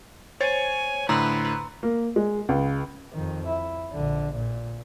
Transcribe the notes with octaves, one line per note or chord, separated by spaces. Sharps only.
C5 C#5 G#5 A6
A2 D3 B4 A#5 C6 E6
A#3
G#3
C#2
F2 D#3
E4
A#1 D3
A#2